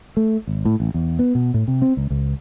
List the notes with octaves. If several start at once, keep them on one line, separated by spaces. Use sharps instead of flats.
A3
G#1
A2
A1
E2
B3
B2
A2
C3
C4
C#2
C#2